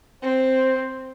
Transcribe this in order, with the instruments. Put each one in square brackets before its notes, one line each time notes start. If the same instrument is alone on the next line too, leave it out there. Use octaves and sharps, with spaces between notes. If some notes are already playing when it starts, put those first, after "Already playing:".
[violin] C4 [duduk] C5